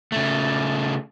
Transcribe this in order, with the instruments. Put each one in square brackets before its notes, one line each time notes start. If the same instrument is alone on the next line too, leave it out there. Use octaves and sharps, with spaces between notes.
[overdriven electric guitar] C#3 A3